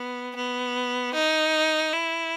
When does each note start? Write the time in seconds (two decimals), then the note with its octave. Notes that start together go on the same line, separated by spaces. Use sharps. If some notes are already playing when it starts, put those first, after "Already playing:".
Already playing: B3
0.35 B3
1.14 D#4
1.93 E4